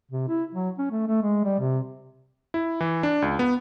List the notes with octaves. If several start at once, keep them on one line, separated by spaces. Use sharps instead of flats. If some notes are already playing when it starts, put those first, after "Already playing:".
C3
E4
F#3
C#4
A3
A3
G#3
G3
C3
E4
E3
D4
C#2
B3